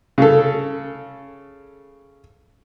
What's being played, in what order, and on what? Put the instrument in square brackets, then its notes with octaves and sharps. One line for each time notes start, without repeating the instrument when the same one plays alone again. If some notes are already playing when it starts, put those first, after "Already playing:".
[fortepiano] C#3 A4